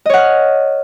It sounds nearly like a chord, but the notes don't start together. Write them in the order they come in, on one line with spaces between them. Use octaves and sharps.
D#5 C#5 F#5 F6